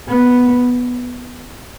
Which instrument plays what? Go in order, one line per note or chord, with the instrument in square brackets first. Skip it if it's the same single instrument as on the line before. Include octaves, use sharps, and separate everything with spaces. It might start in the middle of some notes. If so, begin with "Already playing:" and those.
[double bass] B3